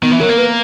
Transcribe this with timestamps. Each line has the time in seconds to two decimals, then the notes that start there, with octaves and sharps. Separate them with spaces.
0.02 D#3 B3
0.11 E3
0.20 F#3 A#4
0.29 A#3
0.38 B4